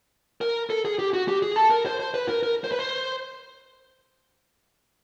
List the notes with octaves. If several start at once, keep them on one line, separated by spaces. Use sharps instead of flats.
A#4
A4
G#4
G4
F#4
G4
G#4
A4
A#4
C5
C5
B4
A#4
A#4
C5
B4
C5